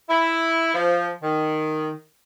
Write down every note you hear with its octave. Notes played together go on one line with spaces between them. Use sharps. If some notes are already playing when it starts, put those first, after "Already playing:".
E4
F3
D#3